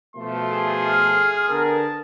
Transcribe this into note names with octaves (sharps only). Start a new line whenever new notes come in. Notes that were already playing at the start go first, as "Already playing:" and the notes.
B2 F3 A3 C6
G#4
F6
D3 B3 A#4 A5